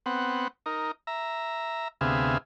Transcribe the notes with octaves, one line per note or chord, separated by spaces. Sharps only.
B3 C4 F#5
D#4 A#4
E5 A#5
D2 C3 B3 G#4 E5 F5